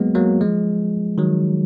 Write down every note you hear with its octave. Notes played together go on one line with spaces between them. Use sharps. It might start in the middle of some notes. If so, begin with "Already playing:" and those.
Already playing: F#3 G#3 A#3 B3
F#3 A#3
F3 G#3
D#3 F#3